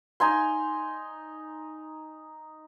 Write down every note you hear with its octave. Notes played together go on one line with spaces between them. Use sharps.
D#4 G#5 C6